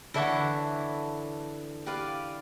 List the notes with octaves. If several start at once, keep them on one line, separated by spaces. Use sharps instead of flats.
D3 E3 E4 A4 C#5 F#5
G4 B4 D5 F5